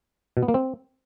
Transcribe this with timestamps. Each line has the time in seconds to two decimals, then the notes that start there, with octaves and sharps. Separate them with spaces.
0.37 B2
0.43 B3
0.48 A#3
0.54 C4